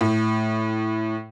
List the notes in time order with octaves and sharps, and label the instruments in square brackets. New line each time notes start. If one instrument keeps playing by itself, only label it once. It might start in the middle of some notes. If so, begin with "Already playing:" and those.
[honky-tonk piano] A2